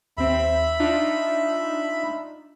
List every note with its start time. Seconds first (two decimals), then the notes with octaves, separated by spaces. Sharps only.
0.17 D#2 C4 E5 B5
0.79 D4 D#4 F4